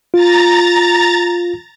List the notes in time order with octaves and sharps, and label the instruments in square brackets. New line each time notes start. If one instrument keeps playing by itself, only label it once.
[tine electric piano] F4 [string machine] A#5 A6